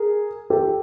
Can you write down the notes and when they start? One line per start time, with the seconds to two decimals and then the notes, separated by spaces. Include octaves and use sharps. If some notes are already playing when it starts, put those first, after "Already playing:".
Already playing: G#4 A#4
0.50 G4 A4